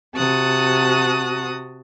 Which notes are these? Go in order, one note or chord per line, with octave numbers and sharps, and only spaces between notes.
C3 F#4 A5 D#6 F#6